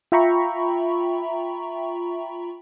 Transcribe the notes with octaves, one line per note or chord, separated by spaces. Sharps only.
F4 E5 G5 A#5 B5 C#6